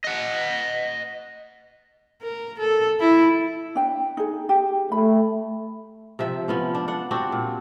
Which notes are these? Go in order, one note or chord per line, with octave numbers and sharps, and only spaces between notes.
D#5 F#5
A#4
A4
E4
D4 G5
D#4 G#4
G4
A3 B5
C3 F3 E5
F3 B3 C#4
D4
D4 F#5
C4 D4 F#4 G4
A#2